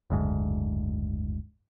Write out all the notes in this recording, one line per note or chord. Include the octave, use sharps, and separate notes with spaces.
F#1 D2 G#2